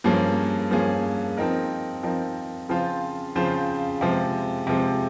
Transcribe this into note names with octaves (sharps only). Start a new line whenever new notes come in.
G2 F3 A#3 C#4 G#4
G2 F3 A#3 C#4 G#4
F3 C4 D#4 A#4
F3 C4 D#4 A#4
C#3 F3 C4 F4 C5
C#3 F3 C4 F4 C5
C3 F3 G#3
C3 F3 G#3